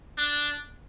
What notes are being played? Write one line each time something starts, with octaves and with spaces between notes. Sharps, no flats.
D4